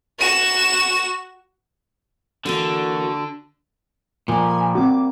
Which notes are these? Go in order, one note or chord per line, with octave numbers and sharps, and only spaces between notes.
F#4 E7
D3 E3 A#3 F#4 A4
A#2 F3 G3 A#3 G#5
C4 F#4 D6